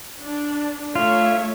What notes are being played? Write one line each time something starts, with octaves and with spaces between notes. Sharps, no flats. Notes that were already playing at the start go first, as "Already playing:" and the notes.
D4
A3 F4 C#5 E5